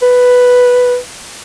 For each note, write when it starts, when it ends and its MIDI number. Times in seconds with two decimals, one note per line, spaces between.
0.02 0.96 71